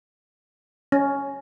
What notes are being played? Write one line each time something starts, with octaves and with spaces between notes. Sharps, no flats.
C#4